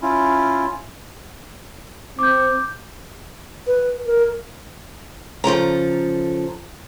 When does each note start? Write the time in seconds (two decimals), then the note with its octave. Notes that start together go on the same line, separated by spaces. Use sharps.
0.01 C#4 E4 F4
2.19 C4 D6 G6
3.67 B4
4.06 A#4
5.44 C#3 F3 A4 A#5